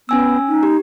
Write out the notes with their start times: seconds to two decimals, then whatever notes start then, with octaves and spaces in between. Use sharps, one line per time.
0.09 B3 C#4 G#5 E6
0.48 D#4
0.63 G4